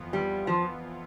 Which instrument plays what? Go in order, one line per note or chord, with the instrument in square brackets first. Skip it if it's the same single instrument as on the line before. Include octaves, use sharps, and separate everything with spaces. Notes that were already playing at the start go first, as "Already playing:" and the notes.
Already playing: [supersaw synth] F2 E3 B3 F4
[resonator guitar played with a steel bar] G3
F3